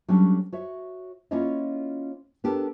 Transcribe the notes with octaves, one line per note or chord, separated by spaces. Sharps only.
F#3 G3 A3 C#4 D4
F#4 C#5 E5
A#3 C#4 E4 F4 C#5 D#5
B3 D4 G4 A4 A#4